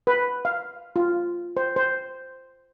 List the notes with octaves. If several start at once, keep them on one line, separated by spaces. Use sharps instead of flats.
B4
F5
F4
C5
C5